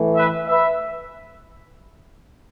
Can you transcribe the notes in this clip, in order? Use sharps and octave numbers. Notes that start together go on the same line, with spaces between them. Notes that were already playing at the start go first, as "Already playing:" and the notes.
Already playing: A2 E3 A3
B4 E5
B4 E5